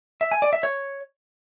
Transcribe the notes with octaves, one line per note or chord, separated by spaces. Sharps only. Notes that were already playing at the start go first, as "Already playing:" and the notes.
E5
G#5
D5
E5
C#5